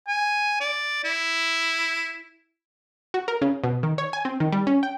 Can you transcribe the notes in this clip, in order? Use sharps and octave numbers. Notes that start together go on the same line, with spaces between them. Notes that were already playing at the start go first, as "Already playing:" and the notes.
G#5
D5
E4
F#4
A#4
C#3
B2
D#3
C#5
G#5
C4
D#3
G3
C#4
G5